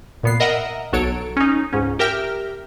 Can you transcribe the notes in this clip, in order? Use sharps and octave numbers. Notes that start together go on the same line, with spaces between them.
A#2 B3 C7
A#4 D#5 E5 F#5 A#5
B1 F#3 A4 C#5 D7
C#4 D#4
C#2 G#2 C#4
G4 A#4 E5 G5 F6